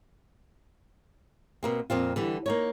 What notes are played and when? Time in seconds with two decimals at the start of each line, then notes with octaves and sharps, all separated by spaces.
1.63 B2 A#3 C4
1.90 F2 A#2 C4 F4
2.16 D3 E3 G3
2.46 A#3 D#4 C#5